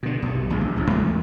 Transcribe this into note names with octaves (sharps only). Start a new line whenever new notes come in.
B2 D3
B1 G2
G#1 D2 A#2 G#3
A#1
D1 A#1 F2
E2 G#3 A3